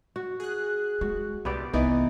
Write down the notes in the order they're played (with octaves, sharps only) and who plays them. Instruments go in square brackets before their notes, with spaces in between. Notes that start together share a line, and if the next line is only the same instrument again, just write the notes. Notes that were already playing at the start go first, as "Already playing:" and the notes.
[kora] F#4
[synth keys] G#4 F#6
[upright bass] G#3 [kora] F#4
[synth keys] C2 [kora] B3 G4 D5
[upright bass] C2 [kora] E3 D#4 D5 [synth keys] B3